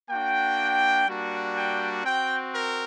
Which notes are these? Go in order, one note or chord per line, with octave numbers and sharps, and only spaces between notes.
A#3 D4 F#4 G5
G3 A#3 D4 F#4
G5
C4 F#4 G5
A#4